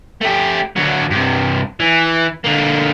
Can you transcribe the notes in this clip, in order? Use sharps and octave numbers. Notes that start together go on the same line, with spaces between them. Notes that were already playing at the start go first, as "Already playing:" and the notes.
A3 G4
D3 F#3
G2 C3
E3
D3 A#3